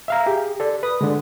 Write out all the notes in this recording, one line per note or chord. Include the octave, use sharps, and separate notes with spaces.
E5 F5 A#5
G4 G#4
A4 D5
B4 D#6
D3 G#3 D4